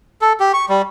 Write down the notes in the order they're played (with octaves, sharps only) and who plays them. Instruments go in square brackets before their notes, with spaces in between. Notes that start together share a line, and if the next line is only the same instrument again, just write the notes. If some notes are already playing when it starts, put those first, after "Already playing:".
[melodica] A4
G4
C#6
G3